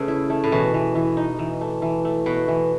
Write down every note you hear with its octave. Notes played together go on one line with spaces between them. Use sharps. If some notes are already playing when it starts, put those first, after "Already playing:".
Already playing: C#3 A3 B4
E4
A3
A2
B2 E3
E3
E3
D#4
E3
A3
E3
A3
B2 B3
E3